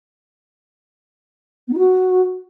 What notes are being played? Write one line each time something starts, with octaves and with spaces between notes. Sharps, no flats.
B3
D#4
F#4